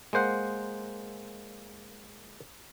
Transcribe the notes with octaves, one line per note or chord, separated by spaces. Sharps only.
G#3 A#3 C5 F#5